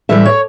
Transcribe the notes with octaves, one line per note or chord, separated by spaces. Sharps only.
A2 E3 G3 E5
C#5